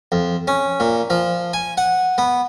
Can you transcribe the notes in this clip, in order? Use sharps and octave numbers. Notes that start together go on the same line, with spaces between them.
F2
C#4
A#2
F3
G#5
F#5
B3